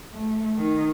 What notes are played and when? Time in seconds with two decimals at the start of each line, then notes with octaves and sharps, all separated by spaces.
0.13 A3
0.57 D#3